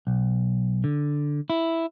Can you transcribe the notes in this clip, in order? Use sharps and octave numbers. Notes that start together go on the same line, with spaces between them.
B1
D3
E4